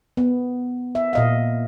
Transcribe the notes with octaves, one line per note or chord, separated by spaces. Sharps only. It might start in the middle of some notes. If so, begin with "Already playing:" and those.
B3
E5
A#2 D#5 F5